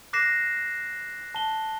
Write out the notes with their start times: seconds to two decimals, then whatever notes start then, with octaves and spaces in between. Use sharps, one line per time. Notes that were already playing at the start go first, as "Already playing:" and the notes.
0.13 D6 F#6 A#6 C7 E7
1.35 A5 G7